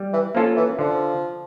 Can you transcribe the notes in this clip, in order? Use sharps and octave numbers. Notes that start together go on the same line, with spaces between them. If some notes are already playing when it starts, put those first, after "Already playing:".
Already playing: G3
E3
F3 A#3 C#4 F4 A4
E3
D3 F3